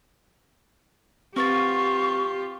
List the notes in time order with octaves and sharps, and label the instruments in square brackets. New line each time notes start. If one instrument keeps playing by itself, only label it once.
[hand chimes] C4 B4 A6 [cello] F4 G4 [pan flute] C#6